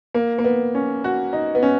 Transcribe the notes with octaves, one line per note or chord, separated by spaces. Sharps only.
A#3
A#3
B3
C#4
F#4
D#4
B3
C#4